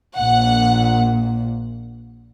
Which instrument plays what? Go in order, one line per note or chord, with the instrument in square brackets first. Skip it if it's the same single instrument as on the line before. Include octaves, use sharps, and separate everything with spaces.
[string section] A#1 A#2 F#5